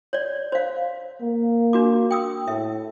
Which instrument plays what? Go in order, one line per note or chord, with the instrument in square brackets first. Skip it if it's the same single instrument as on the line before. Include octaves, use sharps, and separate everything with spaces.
[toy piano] C#5 D5
C5 F5
[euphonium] A#3
[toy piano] D4 F#4 D6
G5 D#6 E6
[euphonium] A2 [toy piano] E5